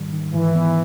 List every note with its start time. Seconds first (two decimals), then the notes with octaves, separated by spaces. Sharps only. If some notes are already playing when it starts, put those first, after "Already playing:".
Already playing: G#2 D#3 G3
0.13 D#3
0.33 G#2 E3
0.55 B3